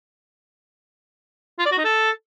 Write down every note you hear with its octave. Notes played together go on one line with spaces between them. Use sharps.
F4
D5
F#4
D#4
A4